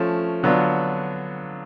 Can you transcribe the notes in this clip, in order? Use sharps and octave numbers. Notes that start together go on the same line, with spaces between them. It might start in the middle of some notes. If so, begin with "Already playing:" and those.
Already playing: F3 A3 C#4
D3 F#3 B3 D4 F4